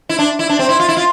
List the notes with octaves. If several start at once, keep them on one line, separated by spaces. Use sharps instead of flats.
E4
D4
E4
D4
C4
E4
F4
E4
F4